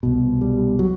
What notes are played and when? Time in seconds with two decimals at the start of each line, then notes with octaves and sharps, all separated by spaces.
0.03 C2 B2
0.41 G3
0.79 F#3